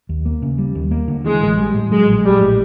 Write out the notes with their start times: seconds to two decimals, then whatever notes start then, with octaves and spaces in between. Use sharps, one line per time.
0.09 D#2
0.26 A#3
0.42 C#3
0.58 G3
0.75 D#2
0.91 A#3
1.08 D3
1.24 E3 G#3
1.41 A1
1.58 G3
1.74 A2
1.91 F#3 G#3
2.08 A#1
2.24 A#1 G3
2.40 A2